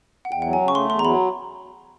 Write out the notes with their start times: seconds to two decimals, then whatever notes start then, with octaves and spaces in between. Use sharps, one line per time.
0.25 F#5
0.31 E2 G5
0.42 F#3 F#5
0.53 G#5
0.61 C#3
0.68 C#6
0.75 A3 C6
0.90 E2 C6
0.99 A#5
1.04 F#3 B5